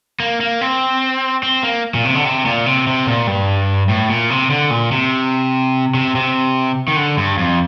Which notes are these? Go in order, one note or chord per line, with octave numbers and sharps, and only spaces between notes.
A#3
A#3
C4
C4
A#3
A#2
C3
D3
C3
A#2
C3
C3
A#2
G2
A2
A#2
C3
D3
A#2
C3
C3
C3
D#3
D3
G2
F2